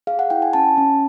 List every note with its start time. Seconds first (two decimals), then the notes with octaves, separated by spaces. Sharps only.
0.07 G#4 F5
0.19 F#5
0.30 E4 G5
0.42 G#5
0.53 C#4 A5
0.78 C#4